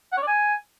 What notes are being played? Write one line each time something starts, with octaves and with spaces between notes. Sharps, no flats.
F#5
C#5
D5
G#5